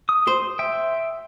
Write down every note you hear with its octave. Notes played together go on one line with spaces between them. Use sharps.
D#6
C5
E5 G5